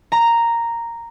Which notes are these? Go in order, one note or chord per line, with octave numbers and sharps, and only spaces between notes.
A#5